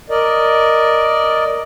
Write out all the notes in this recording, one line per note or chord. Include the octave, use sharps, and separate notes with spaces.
A#4 D5 D#5